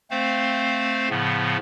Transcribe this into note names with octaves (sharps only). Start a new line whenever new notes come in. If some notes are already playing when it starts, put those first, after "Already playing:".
A3 C4 C5 F5
A2 C#3 F3 B3